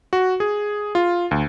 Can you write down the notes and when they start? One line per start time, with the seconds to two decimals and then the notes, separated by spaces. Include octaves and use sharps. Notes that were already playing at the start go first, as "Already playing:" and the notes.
0.13 F#4
0.40 G#4
0.95 F4
1.31 D2